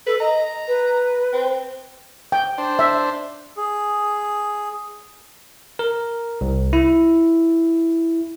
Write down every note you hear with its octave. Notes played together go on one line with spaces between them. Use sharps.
A4 B4
D#5 A#5
B4
C4
G5
D4 C5
E5
G#4
A#4
C2
E4